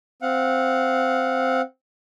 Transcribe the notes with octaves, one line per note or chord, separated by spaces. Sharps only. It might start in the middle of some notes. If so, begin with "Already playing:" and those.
C4 F5 F#5